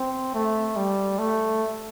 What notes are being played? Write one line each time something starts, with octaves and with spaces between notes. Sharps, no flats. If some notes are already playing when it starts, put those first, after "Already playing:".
Already playing: C4
A3
G3
A3